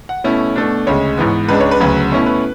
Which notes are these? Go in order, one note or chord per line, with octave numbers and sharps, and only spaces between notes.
F#5
B2 A3 C#4 E4
B2 A3 D4
D2 C#3 G#3 C#5
G#2 E3 B3
C#2 C#3 G#3 D4 B4
C#5
B4
D2 C#3 F#3
B2 A3 C#4 E4
B4